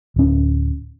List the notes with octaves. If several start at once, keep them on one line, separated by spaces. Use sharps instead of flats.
D1 C#4